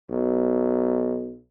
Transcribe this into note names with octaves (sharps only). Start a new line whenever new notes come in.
B1